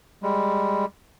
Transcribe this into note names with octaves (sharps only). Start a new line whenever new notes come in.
G3 G#3